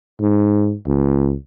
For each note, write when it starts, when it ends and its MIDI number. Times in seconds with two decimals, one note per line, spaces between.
0.21 0.75 44
0.87 1.35 37